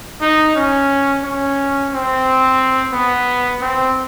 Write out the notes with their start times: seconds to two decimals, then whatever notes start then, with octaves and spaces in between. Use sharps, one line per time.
0.21 D#4
0.56 C#4
1.24 C#4
1.91 C4
2.93 B3
3.61 C4